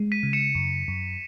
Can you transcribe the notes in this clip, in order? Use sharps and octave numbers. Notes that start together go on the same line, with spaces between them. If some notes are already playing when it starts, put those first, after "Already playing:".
Already playing: G#3
B6 D#7
C#3
C#7 E7
F#2
F#2